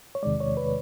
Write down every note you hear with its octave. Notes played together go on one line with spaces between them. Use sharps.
C#5
E2 C3 D#3 G#3 D5
C#5
B4